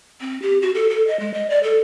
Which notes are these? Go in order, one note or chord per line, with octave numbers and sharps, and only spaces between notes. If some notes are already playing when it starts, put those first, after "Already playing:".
C4
G4
F#4
A4
A4
D#5
G#3
D#5
D5
A4